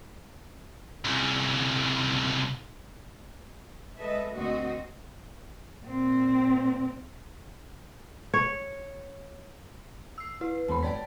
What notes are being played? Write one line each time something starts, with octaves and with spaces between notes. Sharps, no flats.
C2 C#3
G#3 A4 B4 D#5 E5
D2 A#3 C4 F#4 D#5
A#2 C4
C#5
E6 C7
E4 B4
E2 G#3 B3 B5
C#5 D5 G5 A5 B6